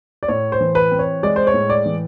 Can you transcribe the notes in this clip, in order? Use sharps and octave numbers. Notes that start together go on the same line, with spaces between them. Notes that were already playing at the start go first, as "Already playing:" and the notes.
D5
A2 C#5
C5
E3
B4
C4
C#5
G#3 D5
C5
C#5
A2
D5
E3